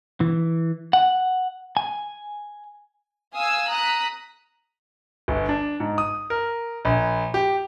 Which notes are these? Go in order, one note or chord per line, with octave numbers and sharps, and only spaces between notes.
E3
F#5
G#5
F5 G#5 D#6 E6
A#5 D#6 F#6 B6
G1
D4
G#2
D#6
A#4
A#1
G4